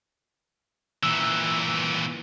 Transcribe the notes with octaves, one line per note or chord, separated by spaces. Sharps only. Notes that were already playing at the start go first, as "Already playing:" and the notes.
A#2 E3 E6